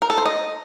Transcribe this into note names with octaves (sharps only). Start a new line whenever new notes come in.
A#4
A4
C5
D#5